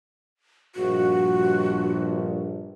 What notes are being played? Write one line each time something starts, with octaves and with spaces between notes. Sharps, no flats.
A#1 G2 F#4